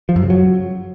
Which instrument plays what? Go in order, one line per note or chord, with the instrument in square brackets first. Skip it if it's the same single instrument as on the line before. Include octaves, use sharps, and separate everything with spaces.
[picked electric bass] F3
F#2
C#3
F#3